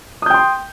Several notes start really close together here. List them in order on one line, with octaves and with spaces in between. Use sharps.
D#6 G6 G5 C6